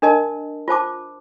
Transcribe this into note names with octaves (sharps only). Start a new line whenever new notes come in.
D4 A#4 D#5 A5
F4 C5 A5 D6